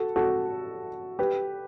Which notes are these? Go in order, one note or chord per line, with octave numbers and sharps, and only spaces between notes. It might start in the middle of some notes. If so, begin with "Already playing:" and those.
Already playing: F#4 A4
F#4 A4
G4 B4